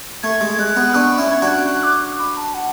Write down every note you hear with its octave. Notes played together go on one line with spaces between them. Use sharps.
A3 G#6
G#3
G#3 F#6
G#3 B3
B3 D4 C#6
B5
C#4 E4
G#6
D4 F#4
F#6
F#6
D6
B5
A5
F#5